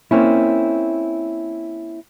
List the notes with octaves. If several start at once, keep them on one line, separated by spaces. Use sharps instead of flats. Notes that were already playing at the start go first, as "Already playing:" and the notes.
A#3 C4 C#4 E4